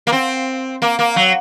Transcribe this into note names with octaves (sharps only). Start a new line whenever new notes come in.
A#3
C4
A#3
A#3
F#3